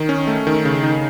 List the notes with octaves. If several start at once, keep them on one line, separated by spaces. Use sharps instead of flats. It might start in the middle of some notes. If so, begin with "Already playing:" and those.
Already playing: D#3
C#4
A3
D#3
C#3
D#4